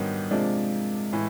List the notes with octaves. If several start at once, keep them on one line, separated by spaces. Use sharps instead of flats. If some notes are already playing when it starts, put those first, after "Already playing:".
Already playing: G#2 D#3 F#3 G3 B3 D4
C3 F3 G#3 A#3 D4
A2 E3